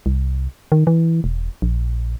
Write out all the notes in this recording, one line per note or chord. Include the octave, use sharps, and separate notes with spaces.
C2
D#3
E3
E1
A#1